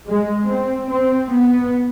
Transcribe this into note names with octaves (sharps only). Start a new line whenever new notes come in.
G#3
C4
C4
B3